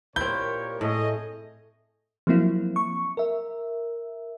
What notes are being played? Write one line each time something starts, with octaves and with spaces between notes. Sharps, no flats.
A#2 C4 E4 G4 A#4 C#5 G6
A2 A3 G#4 C#5 D#5
F3 F#3 A#3 C4 E4 F4
C#6
A#4 E5